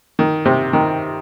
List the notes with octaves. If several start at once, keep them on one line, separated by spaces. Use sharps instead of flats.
D#3
C3
D#3